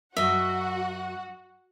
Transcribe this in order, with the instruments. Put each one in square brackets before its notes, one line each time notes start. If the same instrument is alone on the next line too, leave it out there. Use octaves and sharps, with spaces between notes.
[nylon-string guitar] F#2 F#3 [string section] F#4 F#5 [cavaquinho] D#5 E5